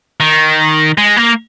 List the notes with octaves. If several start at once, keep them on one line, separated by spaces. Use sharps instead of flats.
D#3
G#3
A#3